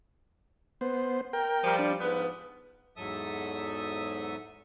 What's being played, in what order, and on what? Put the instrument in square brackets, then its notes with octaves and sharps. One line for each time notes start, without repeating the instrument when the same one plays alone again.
[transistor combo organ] B3 C5
A#4 G5
[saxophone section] F3 G3
[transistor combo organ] D4
[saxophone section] G#2 F3 B3 [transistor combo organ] B4
[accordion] E2 G#2 F#3 A4 E5 D#6